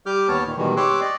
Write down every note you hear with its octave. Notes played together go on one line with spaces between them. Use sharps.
G3 G4 D6 F6 G6
D#2 B3 C#5 A5 F6
A#2 D#3
B2 D#3 E3 G3 G#3
G4 C#5 C6 D6 E6 F#6
D5 D#5